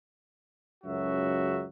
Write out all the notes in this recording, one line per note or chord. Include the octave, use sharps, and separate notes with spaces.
C#2 F#2 C#3 F#3 F#4 E5